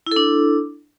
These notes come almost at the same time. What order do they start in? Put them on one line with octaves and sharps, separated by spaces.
E4 A4 D4